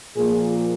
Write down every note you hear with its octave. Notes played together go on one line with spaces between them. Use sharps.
A#2 F3 A#3 G#4